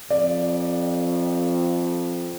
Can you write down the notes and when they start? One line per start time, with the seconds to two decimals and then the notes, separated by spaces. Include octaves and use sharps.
0.10 F2 D5